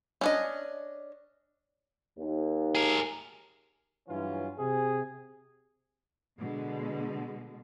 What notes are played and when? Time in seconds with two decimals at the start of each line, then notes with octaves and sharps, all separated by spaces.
0.21 C#4 D4 D#5
2.19 D#2
2.75 G#4 A#4
4.09 G2 E3 F#3 C#4 F4
4.59 C3 G#4
6.39 B2 D3 G#3